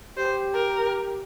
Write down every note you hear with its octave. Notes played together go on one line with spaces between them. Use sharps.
G4 C5
A#4